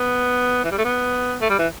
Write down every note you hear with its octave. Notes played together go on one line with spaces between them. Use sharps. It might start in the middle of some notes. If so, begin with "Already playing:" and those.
Already playing: B3
E3
G3
A3
B3
A3
G3
E3